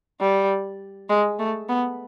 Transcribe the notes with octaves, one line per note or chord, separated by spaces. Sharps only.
G3
G#3
A3
B3